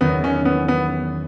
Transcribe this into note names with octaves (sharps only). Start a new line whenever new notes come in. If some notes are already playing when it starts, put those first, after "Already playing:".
E2 D#3 F#3 B3
C#4
B3
B3